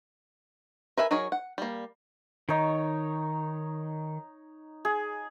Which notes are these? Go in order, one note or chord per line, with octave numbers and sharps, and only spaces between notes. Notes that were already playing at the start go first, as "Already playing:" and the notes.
A#4 B4 E5 F5 G#5
F#3 D#4 G#4 A#4 C#5
F#5
G3 A#3
D#3 D#4 C#5
G#4